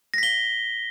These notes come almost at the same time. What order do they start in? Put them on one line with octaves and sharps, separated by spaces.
A#6 B6 G7